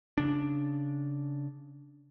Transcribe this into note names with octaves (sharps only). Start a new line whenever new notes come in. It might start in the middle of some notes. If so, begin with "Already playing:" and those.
C#3 D4